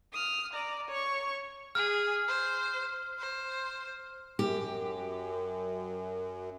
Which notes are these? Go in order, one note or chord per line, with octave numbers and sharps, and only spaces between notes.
D#6 F6
D5 A#5
C#5 C#6
G#4 F6
C5
C5
F#2 G4